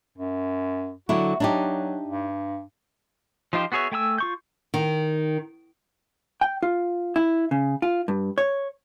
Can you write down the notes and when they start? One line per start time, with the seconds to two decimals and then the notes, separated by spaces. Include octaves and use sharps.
0.18 F#2
1.09 D3 F#3 E4 F#4
1.40 F#3 D4 D#4 G4
2.08 G2
3.53 F3 D#4 F4 G4 C5
3.72 B3 F#4 G#4 C#5 E5
3.92 A3 G5 G#5 A#5 E6
4.18 F4 C#6 G6
4.74 D#3
6.41 G5
6.63 F4
7.16 E4
7.51 C#3
7.82 F4
8.08 G2
8.38 C#5